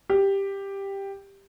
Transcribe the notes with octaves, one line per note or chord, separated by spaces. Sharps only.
G4